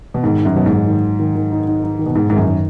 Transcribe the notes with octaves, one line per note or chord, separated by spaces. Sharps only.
B2
G#2 D#3
D#4
F#2
B2 F#3
G#2
F#3
D#3
D#3
D#3
D#3
D#4
D#4
D#4
D#3
B2
G#2 D#3
G#2 D#3
F#2
D#3